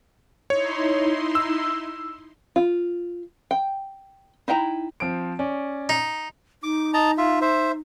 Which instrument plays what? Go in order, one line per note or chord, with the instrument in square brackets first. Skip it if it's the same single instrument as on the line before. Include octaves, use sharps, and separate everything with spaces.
[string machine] D#4 E4 C6 [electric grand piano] C#5
[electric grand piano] E6
[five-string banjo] F4
G5
D#4 E4 G5 A#5
[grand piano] F3 C4 D7
C#4 D5
[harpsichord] D#4
[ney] D#4 [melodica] D6
[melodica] D#5 A5 A#5
F4 E5
C5 E5